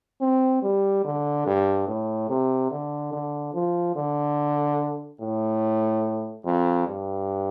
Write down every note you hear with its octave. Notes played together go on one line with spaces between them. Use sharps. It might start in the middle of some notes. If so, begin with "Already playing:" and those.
C4
G3
D3
G2
A2
C3
D3
D3
F3
D3
A2
F2
G2